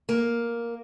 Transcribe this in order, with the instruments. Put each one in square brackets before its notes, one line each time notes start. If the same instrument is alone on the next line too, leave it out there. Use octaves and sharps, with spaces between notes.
[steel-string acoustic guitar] A#3